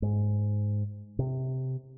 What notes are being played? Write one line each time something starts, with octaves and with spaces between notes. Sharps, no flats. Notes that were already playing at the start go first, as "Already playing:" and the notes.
G#2
C3